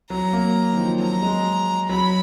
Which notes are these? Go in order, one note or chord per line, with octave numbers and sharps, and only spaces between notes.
F#3 A#5
A#3
D#3
F3
F#3 A#5
G#3
F#3 B5